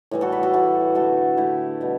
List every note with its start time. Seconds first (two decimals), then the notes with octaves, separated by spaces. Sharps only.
0.11 A2 E3 G3
0.21 F#4 A4
0.32 G4 B4
0.43 F#4 A4
0.53 A2 E3 G3 F#4 A4
0.95 D3 A3 F#4 A4
1.37 D3 A3 E4 G4
1.81 B2 G3